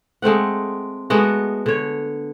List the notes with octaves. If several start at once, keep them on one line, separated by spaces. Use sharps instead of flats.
G#3 A3 C4 F#5
G#3 A3 B3 F#4
D3 C#5